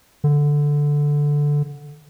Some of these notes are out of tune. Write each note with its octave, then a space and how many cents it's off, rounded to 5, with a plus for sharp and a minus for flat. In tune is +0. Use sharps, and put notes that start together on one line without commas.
D3 -5